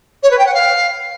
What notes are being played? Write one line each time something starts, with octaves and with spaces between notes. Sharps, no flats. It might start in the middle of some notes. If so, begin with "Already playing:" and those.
C#5
B4
G5
F#5
F5